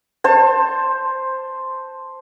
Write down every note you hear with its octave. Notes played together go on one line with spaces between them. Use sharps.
C5 A5